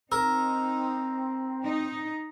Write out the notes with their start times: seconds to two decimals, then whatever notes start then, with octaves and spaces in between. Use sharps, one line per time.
0.12 C4 D#4 A#4 E6
1.63 D#4